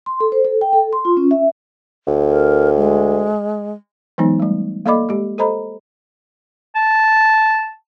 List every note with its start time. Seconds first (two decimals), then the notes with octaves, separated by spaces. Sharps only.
0.06 C6
0.20 A4
0.32 C5
0.45 A4
0.61 G5
0.73 A4
0.93 C6
1.05 F4
1.17 C#4
1.31 E5
2.07 D2
2.28 A#4
2.77 G#3
4.18 E3 F#3 G#3 B3 D#4
4.40 G3 A3
4.86 A#3 A4 D5 D#5 B5 D6
5.09 G#3 G4
5.38 A4 C5 D#5 A#5 B5
6.76 A5